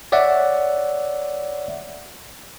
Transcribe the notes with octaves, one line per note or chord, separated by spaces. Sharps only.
C#5 D5 E5 F#5